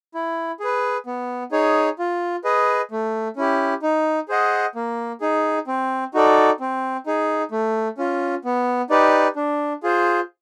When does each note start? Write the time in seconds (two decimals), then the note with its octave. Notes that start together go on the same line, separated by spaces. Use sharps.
0.15 E4
0.60 G#4 B4
1.06 B3
1.52 D#4 G#4 C#5
1.99 F4
2.44 G#4 B4 D#5
2.91 A3
3.36 C#4 E4 G4
3.83 D#4
4.29 G#4 C5 D#5 F#5
4.75 A#3
5.21 D#4 G#4
5.67 C4
6.14 D#4 F#4 A4 D5
6.60 C4
7.07 D#4 G#4
7.51 A3
7.98 C#4 F4
8.45 B3
8.90 D#4 G4 B4 D5
9.36 D4
9.83 F4 G#4 C5